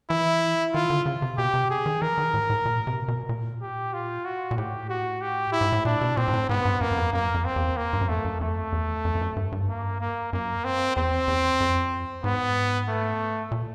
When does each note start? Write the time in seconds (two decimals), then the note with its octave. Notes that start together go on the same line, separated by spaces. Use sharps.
0.10 E3 E4
0.74 D#3 F4
0.90 D3
1.06 C#3
1.22 C3
1.38 B2 G4
1.54 C3
1.70 G#4
1.86 D#3
2.02 E3 A#4
2.18 D#3
2.34 A2
2.50 A2
2.65 A#2
2.87 C3
3.08 B2
3.29 A#2
3.62 G4
3.94 F4
4.25 F#4
4.51 A#2
4.58 A2 G4
4.89 F#4
5.22 G4
5.53 E4
5.61 G#2
5.72 A2
5.85 A#2 D4
6.01 B2
6.17 A#2 C4
6.28 G#2
6.33 A2
6.49 G#2 B3
6.65 G2
6.81 F#2 A#3
6.92 F#2
6.97 F2
7.13 F#2 A#3
7.34 F2
7.45 C4
7.56 E2
7.77 A#3
7.93 G2
8.01 F#2
8.09 F2 A3
8.25 F#2
8.41 F2 A3
8.72 E2
9.05 F2
9.15 F2
9.21 F#2
9.36 G2
9.52 G2
9.69 A#3
10.00 A#3
10.33 F#2 A#3
10.65 C4
10.96 E2 C4
11.28 E2
11.60 F2
12.24 G#2 B3
12.88 A3
13.51 A#2